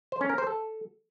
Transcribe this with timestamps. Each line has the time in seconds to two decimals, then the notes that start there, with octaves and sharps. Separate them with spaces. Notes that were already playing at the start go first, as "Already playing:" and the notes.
0.12 C5
0.21 C#4
0.29 A#4
0.38 C5
0.47 A4